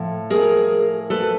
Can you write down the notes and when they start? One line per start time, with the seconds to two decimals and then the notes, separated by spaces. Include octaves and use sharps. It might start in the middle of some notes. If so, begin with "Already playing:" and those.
Already playing: A2 F3
0.30 G#4 A#4
1.10 A4 B4